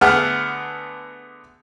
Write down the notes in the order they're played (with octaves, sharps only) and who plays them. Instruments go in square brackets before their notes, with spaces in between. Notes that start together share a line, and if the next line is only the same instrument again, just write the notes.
[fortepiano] D3 A3 B3 G#4 F#5 F6